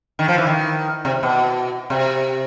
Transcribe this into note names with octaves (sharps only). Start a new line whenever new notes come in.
D#3
F3
E3
D#3
C3
B2
C3